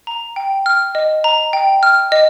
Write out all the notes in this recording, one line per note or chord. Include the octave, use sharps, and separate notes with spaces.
A#5
G5
F6
D#5
A#5
G5
F6
D#5